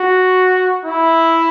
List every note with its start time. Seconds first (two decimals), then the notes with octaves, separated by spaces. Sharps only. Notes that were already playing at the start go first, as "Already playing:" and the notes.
Already playing: F#4
0.85 E4